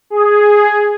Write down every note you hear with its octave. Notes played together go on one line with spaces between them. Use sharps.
G#4